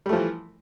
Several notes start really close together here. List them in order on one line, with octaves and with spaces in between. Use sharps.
G3 A3 F3 E3